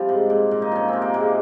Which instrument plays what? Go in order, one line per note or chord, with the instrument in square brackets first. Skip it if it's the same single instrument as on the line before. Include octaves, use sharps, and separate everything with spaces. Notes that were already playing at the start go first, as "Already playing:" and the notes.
Already playing: [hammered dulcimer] C3 F3 G3
G#2
A#2
A#2
D#4
F3 C#4
C3 C4
A#3
A#2 G#3